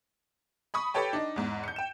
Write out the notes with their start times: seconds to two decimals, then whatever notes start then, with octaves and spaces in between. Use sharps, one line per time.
0.74 B5 C#6 D#6
0.94 G4 A4 B4 C#5 G5 A5
1.13 D4 D#4
1.36 E2 G#2
1.64 G6 C#7
1.76 G5 E7